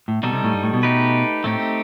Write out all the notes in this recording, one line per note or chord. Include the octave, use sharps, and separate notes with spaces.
A2
B2 G3 D#4 A4
C3
A2
G2
A2
B2
A3 D#4 G4 B4
A2 A3 C4 D#4 G4